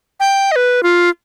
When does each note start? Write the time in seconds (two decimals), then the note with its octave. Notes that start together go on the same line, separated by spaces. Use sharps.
0.20 G5
0.52 D#5
0.56 B4
0.83 F4